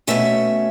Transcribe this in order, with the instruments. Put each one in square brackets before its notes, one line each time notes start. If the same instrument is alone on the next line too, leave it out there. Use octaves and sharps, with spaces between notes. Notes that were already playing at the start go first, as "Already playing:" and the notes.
[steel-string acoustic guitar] B2 F#3 A3 C#4 C#5 E5